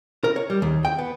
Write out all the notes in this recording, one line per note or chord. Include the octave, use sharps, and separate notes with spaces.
A#4
C#5
G3
D#2
G5
B3